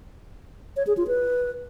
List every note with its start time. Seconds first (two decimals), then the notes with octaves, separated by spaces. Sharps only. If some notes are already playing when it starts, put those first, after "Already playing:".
0.76 C#5
0.87 G#4
0.97 F4
1.08 B4